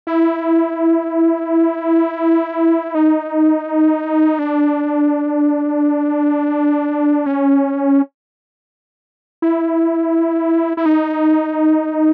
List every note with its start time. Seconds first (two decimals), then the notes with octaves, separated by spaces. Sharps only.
0.07 E4
2.95 D#4
4.39 D4
7.26 C#4
9.42 E4
10.77 E4
10.86 D#4